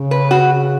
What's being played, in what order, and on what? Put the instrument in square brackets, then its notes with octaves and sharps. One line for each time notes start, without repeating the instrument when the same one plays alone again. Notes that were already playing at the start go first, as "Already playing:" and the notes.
Already playing: [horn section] C#3
[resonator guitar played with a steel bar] B4
F#4